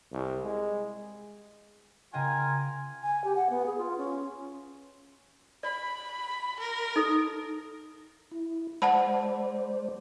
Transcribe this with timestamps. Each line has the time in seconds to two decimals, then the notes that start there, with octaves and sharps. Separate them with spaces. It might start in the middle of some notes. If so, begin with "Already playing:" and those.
0.12 C2
0.44 G#3
2.13 C#3 F4 A#4 D#5 G5 G#5
3.02 G#5
3.24 G4
3.36 F#5
3.50 B3
3.66 G#4
3.78 F4
3.98 C#4
5.63 D5 B5
6.59 A#4
6.96 D#4 A4
8.31 E4
8.82 G#3 C5 D5 F#5 A5 B5